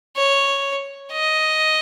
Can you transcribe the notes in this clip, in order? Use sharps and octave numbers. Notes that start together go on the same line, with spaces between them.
C#5
D#5